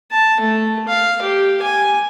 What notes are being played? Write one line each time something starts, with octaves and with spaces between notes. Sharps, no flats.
A5
A3
F5
G4
G#5